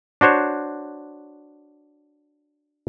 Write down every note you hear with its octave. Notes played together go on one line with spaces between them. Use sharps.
D4 F#4 C5 C#5